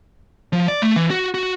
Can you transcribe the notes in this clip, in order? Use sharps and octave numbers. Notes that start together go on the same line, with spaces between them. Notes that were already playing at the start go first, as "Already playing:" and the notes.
F3
D5
A3
E3
F#4
F#4